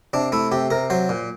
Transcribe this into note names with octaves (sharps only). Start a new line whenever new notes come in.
C3 D4
A3 E4
C3 G4
C3 A#4
F#3 C5
A#2